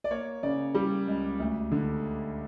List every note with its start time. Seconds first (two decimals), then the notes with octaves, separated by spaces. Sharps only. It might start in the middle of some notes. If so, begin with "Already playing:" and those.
0.04 D5
0.11 A#3 C#5
0.43 C#3 D5
0.75 G3
1.07 C#2
1.40 D2
1.72 D3